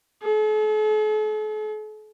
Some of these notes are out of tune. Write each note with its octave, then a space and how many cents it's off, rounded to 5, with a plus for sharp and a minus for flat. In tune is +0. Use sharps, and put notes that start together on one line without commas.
A4 -45